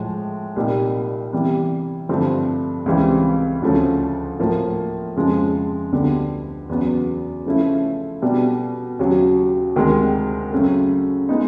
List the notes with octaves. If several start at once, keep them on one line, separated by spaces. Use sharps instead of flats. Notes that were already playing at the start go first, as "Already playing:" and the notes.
Already playing: A2 F3 G#3
C2 A#2 G3 A#3 D#4
C3 E3 G3 B3
G2 D3 F3 A3 C4
C#2 C3 E3 G3 C4
D2 C#3 F3 A3 C#4
A2 F3 A#3
F2 C#3 F3 G#3
D2 D3 G3 B3
E2 C#3 F#3 B3
C#3 F3 A3 C#4 E4
B2 G3 B3 D4
D#2 C#3 F#3
D2 C3 D#3 G#3
F#2 C#3 F#3 A3
G#3 B3 D#4